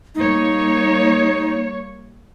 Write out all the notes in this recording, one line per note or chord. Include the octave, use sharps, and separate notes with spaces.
G3 A#3 D#4 C#5